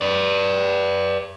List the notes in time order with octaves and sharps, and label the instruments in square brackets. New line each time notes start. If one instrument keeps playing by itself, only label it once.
[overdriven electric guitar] B4 D5